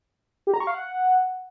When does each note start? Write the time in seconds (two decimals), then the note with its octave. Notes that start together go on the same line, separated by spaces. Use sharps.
0.47 G4
0.54 A#5
0.60 C#6
0.67 F5
0.74 F#5